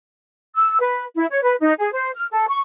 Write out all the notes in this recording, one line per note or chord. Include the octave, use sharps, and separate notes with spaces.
E6
B4
E4
C#5
B4
D#4
G#4
C5
F6
A4
C#6